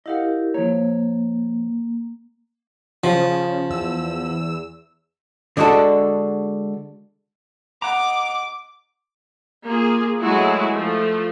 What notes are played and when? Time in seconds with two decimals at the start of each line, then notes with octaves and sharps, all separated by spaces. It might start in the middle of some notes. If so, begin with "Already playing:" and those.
0.06 E4 G4 A#4 D#5 F5 F#5
0.54 F3 A#3 C#5
3.04 C#3 F3
3.70 E2 E6
5.57 D3 G#3 D4 F#4 A4
7.82 D#5 F#5 A#5 D6
9.64 A#3 F4 G#4
10.21 F#3 G#3 A3 E4 F#4 G#4
10.72 F3 A3